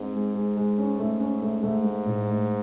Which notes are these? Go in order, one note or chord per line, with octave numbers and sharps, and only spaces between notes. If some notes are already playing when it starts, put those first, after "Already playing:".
Already playing: G#2 C4
G#3
G#3
G#3
C#4
A3
C#4
A3
G#2 A3
A3
A2
A3